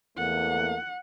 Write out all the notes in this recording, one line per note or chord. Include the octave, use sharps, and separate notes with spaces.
E2 A3 A#3 F#5